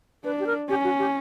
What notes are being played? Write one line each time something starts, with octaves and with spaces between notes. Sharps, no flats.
D4 B4
G4
A#4
C#4 G4
F#4
G4